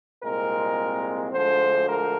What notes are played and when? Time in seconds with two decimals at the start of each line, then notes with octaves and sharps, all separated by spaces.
0.23 C2 A#2 G#3 C4 A#4
1.32 D2 D3 F3 G#3 C5
1.88 A#4